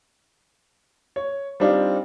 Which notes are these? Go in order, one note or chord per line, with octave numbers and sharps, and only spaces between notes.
C#5
G3 C4 D4 D#4 F4